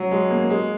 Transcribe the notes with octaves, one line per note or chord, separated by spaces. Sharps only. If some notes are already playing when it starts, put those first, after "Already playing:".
Already playing: F#3
G#3
A#3
G#3